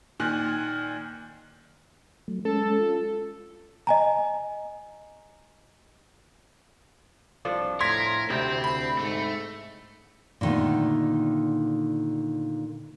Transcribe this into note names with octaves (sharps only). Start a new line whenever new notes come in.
A#2 D#3 G#5 F6 F#6 F#7
F#3 A3
G#3 C#4 A4
F4
D#5 G#5 A#5
C2 F3 D4 A4
A2 A#4 C6 G#6 B6
D2 C3 C4 E4 G5
B5
G#2 A3
A#2 D3 D#3 A3 B3